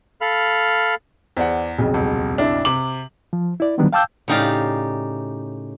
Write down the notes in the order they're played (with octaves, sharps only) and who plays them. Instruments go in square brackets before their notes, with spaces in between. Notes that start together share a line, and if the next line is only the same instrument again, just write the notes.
[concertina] A4 F5 B5 F6
[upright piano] E2 [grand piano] C5 D5 F#5
[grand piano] B1 F2 C#3
[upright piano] D#1
D4 E4
[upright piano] C3 D6 [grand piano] F#7
[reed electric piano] F3
E4 D5
D3 D#3 F#3 G3 B3 D4
F5 G5 A5 D6 E6 G6
[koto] A2 C#3 D#4 G4 D5 F5